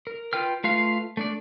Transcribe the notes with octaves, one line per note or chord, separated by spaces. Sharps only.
A#4
F4 B4 G5 F6
A3 F4 B4 F5
A3 D4 D5